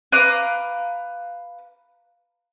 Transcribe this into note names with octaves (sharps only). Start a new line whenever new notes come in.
B4 F5 A#5 D6